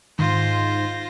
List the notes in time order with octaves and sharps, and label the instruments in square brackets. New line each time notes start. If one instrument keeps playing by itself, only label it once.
[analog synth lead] G#2 [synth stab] D#3 [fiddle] F4 [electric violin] C5 A#6